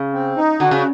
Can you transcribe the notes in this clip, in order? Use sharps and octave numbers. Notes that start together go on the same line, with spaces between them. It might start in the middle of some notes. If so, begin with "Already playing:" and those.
Already playing: C#3
C4
D#4
D3 F#4
C#3